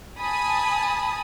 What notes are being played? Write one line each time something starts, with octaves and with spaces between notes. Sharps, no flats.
G#5 A5 B5 D#6